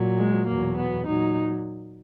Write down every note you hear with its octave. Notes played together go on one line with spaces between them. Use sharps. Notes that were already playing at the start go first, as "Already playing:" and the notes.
Already playing: A#2 F#3
G#3
E2 B2 F#3 A#3
B3
A#2 F#3 D#4